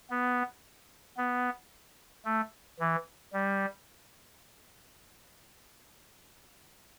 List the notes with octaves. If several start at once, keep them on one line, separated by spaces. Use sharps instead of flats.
B3
B3
A3
E3
G3